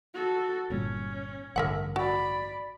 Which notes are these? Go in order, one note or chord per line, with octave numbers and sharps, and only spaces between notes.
F#4 A4
G1 A#2 G3 C#4
A1 G2 D3 A#4 E5 F#5
F#4 D5 B5